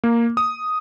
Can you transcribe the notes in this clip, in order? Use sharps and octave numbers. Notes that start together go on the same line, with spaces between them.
A#3
D#6